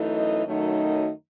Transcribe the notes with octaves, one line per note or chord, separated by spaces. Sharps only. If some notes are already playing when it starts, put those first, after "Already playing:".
Already playing: F#2 E3 A3 D#4
D#5
F#2 D#3 F#3 A3 D#4